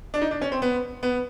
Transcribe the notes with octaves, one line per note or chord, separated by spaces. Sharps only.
D4
D#4
D4
C#4
C4
B3
B3